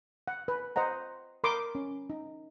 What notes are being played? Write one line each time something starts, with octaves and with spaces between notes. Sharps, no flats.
F#5
B4
C5 D#5 F#5 A#5
A#4 B5 C6 D6 D#6
C#4
D#4